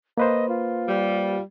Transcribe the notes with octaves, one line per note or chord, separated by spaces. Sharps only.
A#3 B4 C5 D#5
F4
G3